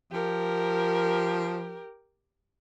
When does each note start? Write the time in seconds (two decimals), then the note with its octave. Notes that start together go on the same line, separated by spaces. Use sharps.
0.12 F3 G4 A#4